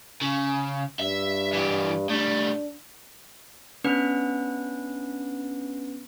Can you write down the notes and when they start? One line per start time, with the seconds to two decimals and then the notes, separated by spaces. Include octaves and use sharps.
0.21 C#3
0.99 G2 E5
1.53 E3 G4
2.09 A2 G3 D4
3.84 B3 C#4 D4 B4